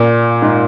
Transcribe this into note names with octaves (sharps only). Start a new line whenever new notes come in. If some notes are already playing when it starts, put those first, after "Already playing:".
Already playing: A#2
G#2